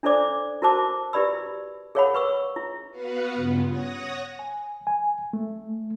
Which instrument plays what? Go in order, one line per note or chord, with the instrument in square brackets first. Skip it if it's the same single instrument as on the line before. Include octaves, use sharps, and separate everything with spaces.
[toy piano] D4 E4 A4 C5 D5 D6
E4 F#4 A#4 C5 A5 D6
E4 G4 B4 D5 B5 E6
G#4 A#4 C#5 F5 F#5 B5
B4 C#6 E6
E4
[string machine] B3 F#4 B4 F5 F#5
G2 C#3 B3 F4
C#5 F#5 D#6 A#6
[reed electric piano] G#5
G#5
A3